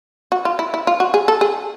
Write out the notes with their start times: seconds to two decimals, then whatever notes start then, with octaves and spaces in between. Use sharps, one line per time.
0.32 F#4
0.45 F4
0.59 E4
0.74 E4
0.87 F4
1.00 F#4
1.14 G#4
1.28 A4
1.41 G#4